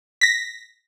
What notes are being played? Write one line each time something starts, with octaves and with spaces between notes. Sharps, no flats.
A#6 B6